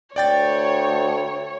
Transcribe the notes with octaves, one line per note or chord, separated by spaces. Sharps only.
D2 C#5 D5 G5 A6